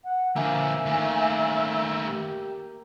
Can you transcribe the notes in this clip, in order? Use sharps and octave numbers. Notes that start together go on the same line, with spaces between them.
F#5
D3 F3 A#3 E5 G#5
D#3 A3
G4